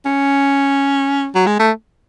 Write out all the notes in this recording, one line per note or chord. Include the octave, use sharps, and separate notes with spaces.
C#4
F#3
G#3
A3